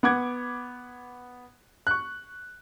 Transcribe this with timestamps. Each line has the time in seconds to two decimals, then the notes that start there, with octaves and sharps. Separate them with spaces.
0.03 B3 F#5 D6 G#6
1.87 C#6 F#6